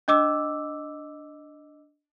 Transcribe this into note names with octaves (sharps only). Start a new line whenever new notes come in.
D4 D#5 D6 E6